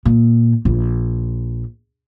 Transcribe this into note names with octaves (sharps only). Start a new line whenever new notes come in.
A#2
A#1